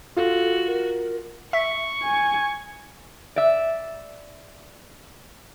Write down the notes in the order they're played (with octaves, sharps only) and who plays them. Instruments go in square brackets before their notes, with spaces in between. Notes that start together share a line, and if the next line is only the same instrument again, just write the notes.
[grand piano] F4 [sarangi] F#4 [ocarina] A4
[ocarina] A#4
[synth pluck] E5 [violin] C#6
[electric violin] G#5
[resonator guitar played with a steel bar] D5 E5